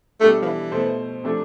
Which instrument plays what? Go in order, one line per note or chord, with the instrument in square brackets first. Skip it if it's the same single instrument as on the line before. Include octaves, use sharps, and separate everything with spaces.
[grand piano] B2 G3 D4 A4 [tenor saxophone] A3
[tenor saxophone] F3
E3
[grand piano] B2 A3 E4 A4 C5
C3 F3 A3 D4